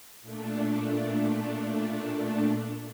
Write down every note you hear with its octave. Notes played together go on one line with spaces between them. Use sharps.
A#2 A3 D4